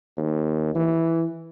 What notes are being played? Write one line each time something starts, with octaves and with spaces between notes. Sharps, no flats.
D#2
E3